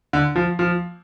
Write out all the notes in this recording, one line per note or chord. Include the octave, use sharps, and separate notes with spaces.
D3
F3
F3